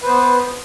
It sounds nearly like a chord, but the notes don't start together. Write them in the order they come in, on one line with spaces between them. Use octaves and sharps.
B4 C5 B3